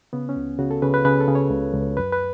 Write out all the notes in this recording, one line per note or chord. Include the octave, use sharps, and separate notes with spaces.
C#3 B3
C#4
C#2
C#3 F#4
A4
C#3 B4
B4
C#3 B4
A4
C#3
C#5
C#2
C#2
F#2 B4
B4